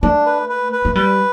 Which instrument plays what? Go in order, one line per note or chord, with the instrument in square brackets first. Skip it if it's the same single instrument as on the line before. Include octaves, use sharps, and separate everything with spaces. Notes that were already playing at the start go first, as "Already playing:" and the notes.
[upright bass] A3 [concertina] D4
[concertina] B4
B4
B4
[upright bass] A3
[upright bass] G3 [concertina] B4